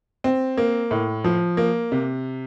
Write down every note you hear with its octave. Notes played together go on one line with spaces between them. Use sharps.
C4
A#3
A2
F3
A#3
C3